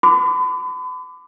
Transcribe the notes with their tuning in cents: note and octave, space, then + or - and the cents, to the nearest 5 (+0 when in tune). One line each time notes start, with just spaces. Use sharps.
B5 +40 D6 +10